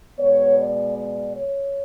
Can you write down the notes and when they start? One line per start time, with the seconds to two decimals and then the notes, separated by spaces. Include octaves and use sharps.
0.19 B2 G#3 B3 C#5
0.59 D5
0.97 D5
1.36 C#5